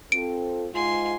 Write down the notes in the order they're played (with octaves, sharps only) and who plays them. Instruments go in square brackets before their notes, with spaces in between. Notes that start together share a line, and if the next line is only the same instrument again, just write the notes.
[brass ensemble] C4 F4 A4 [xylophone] D7
[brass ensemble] G#2 [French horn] F4 [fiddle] G#5 C6